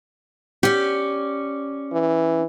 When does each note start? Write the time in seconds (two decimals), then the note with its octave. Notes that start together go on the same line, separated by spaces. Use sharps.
0.63 C#4 G4 D5
1.93 E3